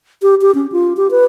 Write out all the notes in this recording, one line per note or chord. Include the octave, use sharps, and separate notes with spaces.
G4
G4
C#4
F4
G4
B4